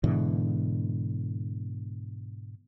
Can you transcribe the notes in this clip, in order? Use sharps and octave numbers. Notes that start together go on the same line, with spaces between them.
G#2 B2 D3 E3